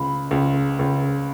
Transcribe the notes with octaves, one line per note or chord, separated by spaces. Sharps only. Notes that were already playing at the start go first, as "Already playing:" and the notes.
Already playing: C#2 B5
C#2
C#2